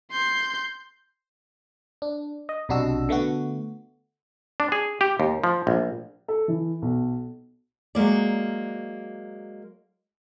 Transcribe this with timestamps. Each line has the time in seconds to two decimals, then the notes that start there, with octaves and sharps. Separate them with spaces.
0.12 C6 G6
2.02 D4
2.49 D#5
2.69 B1 C3 D4 F#4 D#5 E6
3.09 D3 A3 B3 F#4
4.60 D4
4.72 G#4
5.01 G4
5.20 D#2
5.44 F3
5.67 A#1
6.28 A4
6.48 E3
6.82 B1
7.95 F#3 G#3 A#3 D5